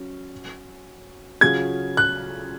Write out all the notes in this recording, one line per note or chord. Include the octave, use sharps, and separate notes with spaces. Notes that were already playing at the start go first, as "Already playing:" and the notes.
Already playing: F#3 C#4
C#3 F#3 C#4 F4 G#4 G#6
F#6